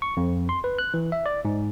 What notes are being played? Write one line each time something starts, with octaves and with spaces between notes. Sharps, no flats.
C#6
F2
C6
B4
F#6
E3
E5
D5
G#2